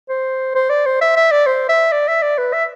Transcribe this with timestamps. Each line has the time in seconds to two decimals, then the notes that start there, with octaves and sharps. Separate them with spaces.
0.09 C5
0.55 C5
0.70 D5
0.86 C5
1.01 E5
1.16 E5
1.31 D5
1.47 C5
1.69 E5
1.92 D5
2.08 E5
2.22 D5
2.38 B4
2.53 E5